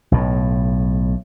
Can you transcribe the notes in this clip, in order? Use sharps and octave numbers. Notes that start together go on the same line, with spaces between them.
B1 A2